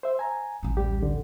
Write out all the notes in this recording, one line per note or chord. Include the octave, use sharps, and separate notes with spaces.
C5 E5
G#5 A#5
A1 D2
G3 G4
D3